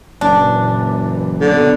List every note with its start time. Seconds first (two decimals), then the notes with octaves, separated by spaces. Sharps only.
0.21 F#1 A#2 E3 D4
1.41 A#2 D3 F#3 B3